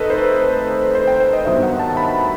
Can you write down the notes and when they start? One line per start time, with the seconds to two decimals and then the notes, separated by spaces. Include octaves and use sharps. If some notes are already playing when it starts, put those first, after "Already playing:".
Already playing: D#3 A3 C4 D#4 A4 B4 D#5
0.10 C5
0.18 B4
0.95 C5
1.07 G5
1.20 C5
1.33 D#5
1.45 G2 D#3 F#3 B3 E5
1.63 F#5
1.79 A5
1.97 B5